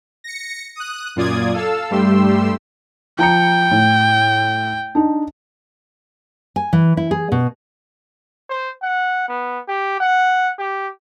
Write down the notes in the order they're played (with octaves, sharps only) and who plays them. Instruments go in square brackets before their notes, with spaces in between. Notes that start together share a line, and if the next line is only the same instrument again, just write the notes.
[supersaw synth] A#6 C#7
D#6 F#6
F#2 A#2 F4 D5 D#6 G#6
A4 F5 A5 E6
G2 G3 A3 G4 C6 E6
[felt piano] F3 A#5 C#7 [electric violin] G5
[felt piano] A2
D4 D#4
[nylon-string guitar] G#5
E3
E4
G#4
B2
[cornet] C5
F#5
B3
G4
F#5
G4